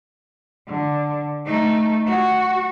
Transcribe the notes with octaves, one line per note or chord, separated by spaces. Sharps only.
D3
A3 D#4
F#4